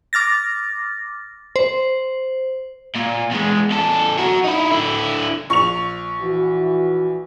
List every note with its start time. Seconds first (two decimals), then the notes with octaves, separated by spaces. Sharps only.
0.13 D6 F6 A6 A#6
1.56 C5
2.95 A#2
3.31 E2 G#3
3.71 E2 A4
4.19 F#4 A#4
4.44 D#4 E4
4.71 D3 E4
5.50 A#1 C#6 F7
6.21 E3 F#4